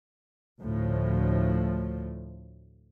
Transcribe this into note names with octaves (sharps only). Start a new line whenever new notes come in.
D2 A2 F3